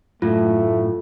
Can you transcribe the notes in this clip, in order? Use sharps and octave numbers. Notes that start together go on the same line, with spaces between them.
F#2 A2 A3 F4